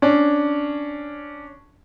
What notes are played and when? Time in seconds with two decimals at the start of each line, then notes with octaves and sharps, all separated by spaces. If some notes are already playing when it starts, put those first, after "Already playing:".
0.02 C#4 D4